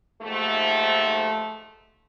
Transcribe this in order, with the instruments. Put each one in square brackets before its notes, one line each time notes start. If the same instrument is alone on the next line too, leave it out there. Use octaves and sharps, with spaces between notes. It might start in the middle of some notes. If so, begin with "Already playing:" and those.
[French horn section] D#2 G#2 F3 A3